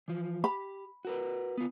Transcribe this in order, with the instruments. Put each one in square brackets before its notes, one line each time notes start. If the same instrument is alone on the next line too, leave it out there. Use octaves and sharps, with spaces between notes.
[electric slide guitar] E3 F3
[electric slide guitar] G4 [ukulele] B5
[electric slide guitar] F#4 A#4 B4
B3 F4